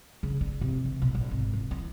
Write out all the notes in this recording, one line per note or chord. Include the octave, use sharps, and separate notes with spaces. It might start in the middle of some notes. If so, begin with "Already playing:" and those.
C#3
D4
C3
E3
B2
A1
G#1
E3
E3